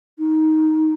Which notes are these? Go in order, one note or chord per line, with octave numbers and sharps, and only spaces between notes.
D#4